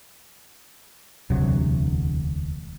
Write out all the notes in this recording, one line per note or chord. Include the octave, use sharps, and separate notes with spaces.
E1 D2 C3 F#3